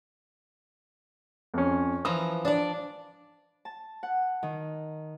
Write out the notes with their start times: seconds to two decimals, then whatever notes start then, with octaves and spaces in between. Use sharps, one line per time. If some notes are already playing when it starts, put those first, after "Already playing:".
1.54 F2 C#4
2.05 E3 F3 A#5 D#6
2.45 D4 D5
3.65 A5
4.03 F#5
4.43 D#3